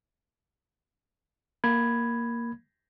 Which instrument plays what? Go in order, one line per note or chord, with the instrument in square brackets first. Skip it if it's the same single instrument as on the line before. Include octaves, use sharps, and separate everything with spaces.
[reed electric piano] A#3 B5 G#6